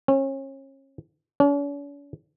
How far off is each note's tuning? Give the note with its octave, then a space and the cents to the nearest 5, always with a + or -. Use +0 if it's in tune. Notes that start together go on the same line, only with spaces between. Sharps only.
C#4 -35
C#4 +45